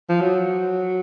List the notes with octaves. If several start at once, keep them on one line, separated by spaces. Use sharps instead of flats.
F3
F#3